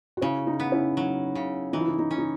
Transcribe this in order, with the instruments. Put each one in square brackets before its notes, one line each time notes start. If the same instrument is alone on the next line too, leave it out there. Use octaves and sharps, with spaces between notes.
[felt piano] F#4
[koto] C#3 [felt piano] C#4 E4
[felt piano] D#4
[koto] B3
[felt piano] C#4 E4
[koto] F#3
C#3
[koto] E3 [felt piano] D#4
[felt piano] E4
D#4
D#4
[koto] C#4
[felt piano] D#4